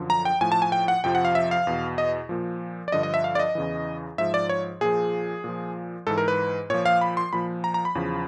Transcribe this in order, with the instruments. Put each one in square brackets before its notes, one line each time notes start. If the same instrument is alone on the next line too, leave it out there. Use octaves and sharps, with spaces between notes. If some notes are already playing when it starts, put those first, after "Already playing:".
Already playing: [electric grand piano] F#2 D3 F3
A#5
G5
A2 F3 G#5
A5
G#5
G5
F#5
F2 C3 F3 G5
F#5
F5
E5
F5
E2 B2
D#5
A#2 F3
D5
G2 D3 F3 D#5
D#5
E5
F5
D5
D#5
E2 C#3 E3
G#2 F3 E5
D5
C#5
A#2 F3 G#4
A#2 F3
G#2 E3 A4
A#4
B4
A#2 F3 C#5
F5
B5
C6
A#2 F3 B5
A#5
A#5
B5
E2 C#3 F3